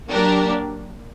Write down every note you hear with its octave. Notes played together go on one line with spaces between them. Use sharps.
F#3 A#3 D4 G4 A#4